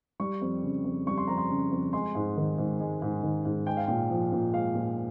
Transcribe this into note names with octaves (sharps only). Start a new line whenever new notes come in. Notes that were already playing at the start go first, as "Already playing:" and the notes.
G3 C#6
F2
C#3
F2
G3 C#6
C6
F2 A#5
C6
C#3
F2
G#3 C6
G#2
D#3
G#2
G#3
G#2
D#3
G#2
G#3 G5
F5
A#2 G5
F3
A#2
G#3 F5
A#2